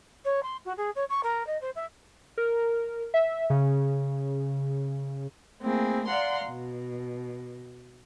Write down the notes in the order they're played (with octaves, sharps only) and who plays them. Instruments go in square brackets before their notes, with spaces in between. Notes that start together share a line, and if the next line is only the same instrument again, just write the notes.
[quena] C#5
C6
F#4
G#4
C#5
C#6
A#4
D#5
C5
E5
[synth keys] A#4
E5
C#3
[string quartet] A3 A#3 C4 E4 G#4
D5 F5 F#5 A#5 C6
B2